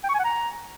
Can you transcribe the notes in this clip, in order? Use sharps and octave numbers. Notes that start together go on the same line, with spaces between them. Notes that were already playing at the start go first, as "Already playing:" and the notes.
G5
C#6
G#5
F#5
A#5